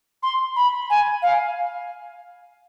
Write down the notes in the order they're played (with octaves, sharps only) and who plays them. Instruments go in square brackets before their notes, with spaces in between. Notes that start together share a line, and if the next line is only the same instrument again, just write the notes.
[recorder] C6
B5
G#5
F5